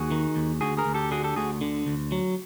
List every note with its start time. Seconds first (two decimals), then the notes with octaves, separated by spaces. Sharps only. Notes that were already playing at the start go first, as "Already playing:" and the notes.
Already playing: D#2 F#4 G#4
0.11 D#3
0.36 D#2
0.61 D2 F#4 G#4
0.77 G#4 A#4
0.86 D2
0.94 G4 A4
1.11 D3 F#4 G#4
1.24 G4 A4
1.36 D2 F#4 G#4
1.61 D3
1.87 D2
2.12 F#3